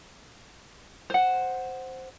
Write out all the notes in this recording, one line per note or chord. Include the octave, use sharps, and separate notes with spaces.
C5 F#5